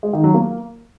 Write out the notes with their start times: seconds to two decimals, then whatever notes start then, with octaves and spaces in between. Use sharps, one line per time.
0.03 G#3
0.13 D#3
0.24 F#3
0.34 A#3